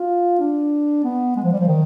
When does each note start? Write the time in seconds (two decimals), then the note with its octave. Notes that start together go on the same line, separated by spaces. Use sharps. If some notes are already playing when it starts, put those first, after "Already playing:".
Already playing: F4
0.39 D4
1.04 B3
1.36 G#3
1.44 F3
1.53 G3
1.60 F3
1.68 D#3